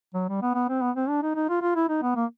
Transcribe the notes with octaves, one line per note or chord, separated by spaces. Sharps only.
F#3
G3
B3
B3
C4
B3
C4
D4
D#4
D#4
F4
F4
E4
D#4
B3
A#3